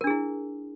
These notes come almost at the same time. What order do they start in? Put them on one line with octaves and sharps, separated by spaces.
A#4 D4 G#4 E4